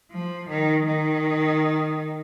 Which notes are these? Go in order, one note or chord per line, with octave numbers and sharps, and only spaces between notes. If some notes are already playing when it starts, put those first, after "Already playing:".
F3
D#3
D#3